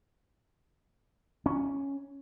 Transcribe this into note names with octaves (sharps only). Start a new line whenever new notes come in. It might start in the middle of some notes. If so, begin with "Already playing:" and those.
C#4